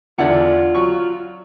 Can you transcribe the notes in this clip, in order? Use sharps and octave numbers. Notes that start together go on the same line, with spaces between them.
E2 D3 F4 D5 E5 F#5
F#3 C#6